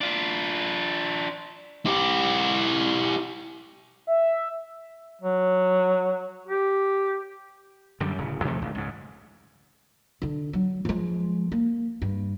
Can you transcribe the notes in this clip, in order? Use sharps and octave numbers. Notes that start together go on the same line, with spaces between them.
D4 F4
E4 G4
E5
F#3
G4
F#2 D3 G3
D1 C#3
D#2 C3 F3 A3
G#1 D2
C#2 G#2
D3 D4
F#3
F3 G#3
A#3
G2